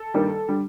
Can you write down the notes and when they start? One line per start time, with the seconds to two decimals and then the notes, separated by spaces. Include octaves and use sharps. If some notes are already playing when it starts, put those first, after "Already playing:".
Already playing: A4
0.14 G2 D#3 G3 A#3
0.48 D3 G3